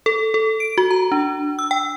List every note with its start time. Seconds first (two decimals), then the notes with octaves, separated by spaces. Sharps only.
0.06 A4
0.34 A4
0.60 D7
0.78 F#4
0.91 A#5
1.12 D4
1.59 E6
1.71 G5